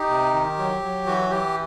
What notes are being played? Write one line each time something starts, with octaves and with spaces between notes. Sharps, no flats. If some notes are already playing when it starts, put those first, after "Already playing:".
Already playing: D#4 G4
C3
D#3
F#3
F#3
E3 F#4
E3 G4